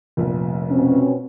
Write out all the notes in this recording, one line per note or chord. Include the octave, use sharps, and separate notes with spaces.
F1 A#1
B2 C4 C#4